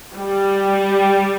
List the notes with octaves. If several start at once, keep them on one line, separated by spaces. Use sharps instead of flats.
G3